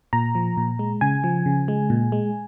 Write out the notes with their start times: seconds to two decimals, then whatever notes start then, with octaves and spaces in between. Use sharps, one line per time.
0.13 A#2 A#5
0.35 F3
0.57 A#2
0.79 G#3
1.01 C#3 G#5
1.24 F3
1.46 C#3
1.68 G#3
1.90 A#2
2.12 G#3